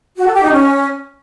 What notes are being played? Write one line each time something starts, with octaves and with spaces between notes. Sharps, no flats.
F#4
A4
G4
D#4
C#4